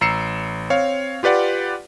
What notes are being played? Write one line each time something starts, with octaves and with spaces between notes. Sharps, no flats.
A1 A#5 E6 C7 C#7 E7
C4 C#5 F5
F4 G4 B4 D5 F#5